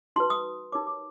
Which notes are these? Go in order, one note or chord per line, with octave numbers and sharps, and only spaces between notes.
D#4 F#4 B4 C6
D#6
D#4 G4 A#4 C#5 D6
D6